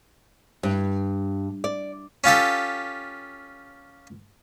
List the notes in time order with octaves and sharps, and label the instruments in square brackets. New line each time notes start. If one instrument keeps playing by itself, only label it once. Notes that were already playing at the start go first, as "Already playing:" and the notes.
[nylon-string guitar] G2
D5
[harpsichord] C#4 F4 G4 A4